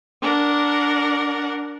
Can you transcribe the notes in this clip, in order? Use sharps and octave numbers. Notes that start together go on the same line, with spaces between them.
D4 A#4 F#5